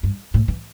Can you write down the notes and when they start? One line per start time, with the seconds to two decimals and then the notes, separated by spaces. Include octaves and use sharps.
0.03 G2
0.34 A2
0.48 E3